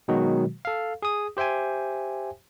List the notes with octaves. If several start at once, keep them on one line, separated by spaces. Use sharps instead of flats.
B2 D#3 F#3 G#3 F#4
A4 F5
G#4 D#6
G4 C5 E5 G5 G#5